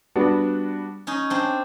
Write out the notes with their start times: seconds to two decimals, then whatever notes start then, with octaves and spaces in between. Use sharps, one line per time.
0.16 G3 B3 D4 F#4
1.07 C#4 D#4
1.30 C4 D4